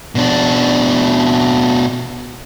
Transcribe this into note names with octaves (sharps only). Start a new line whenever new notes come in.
B2 D4